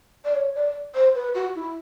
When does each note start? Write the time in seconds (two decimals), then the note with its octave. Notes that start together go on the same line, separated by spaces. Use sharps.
0.25 D5
0.35 C#5
0.55 D5
0.95 C5
1.15 B4
1.35 F#4
1.55 E4